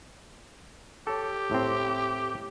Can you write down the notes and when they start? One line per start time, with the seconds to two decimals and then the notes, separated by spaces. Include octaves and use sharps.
1.07 G4 A4 C#5
1.51 A2 C4